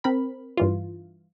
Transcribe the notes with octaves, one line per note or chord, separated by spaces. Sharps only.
C4 A#4 B5
G2 E3 F4